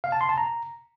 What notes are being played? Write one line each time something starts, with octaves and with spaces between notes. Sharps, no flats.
F5
A5
C6
A5
A#5